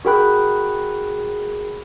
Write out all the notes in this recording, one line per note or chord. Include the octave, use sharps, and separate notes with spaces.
F#4 G#4 A#4 G5 B5 F#6